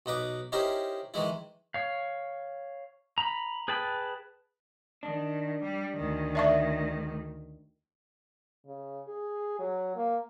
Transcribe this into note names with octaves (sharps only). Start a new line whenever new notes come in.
B1 D#4 B4 D6
C#4 D#4 E4 G4 A#4 C5
D#3 E3 G#3 E4
C#5 F5
A#5 B5
G#4 B4 G5 A5 B5
D#3 D4
G3
D2 D#3
D5 E5 C#6
C#3
G#4
F#3
A#3